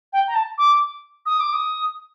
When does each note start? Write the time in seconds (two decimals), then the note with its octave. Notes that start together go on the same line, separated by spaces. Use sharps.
0.13 G5
0.28 A#5
0.35 A5
0.58 D6
1.26 D#6
1.40 D6
1.53 D#6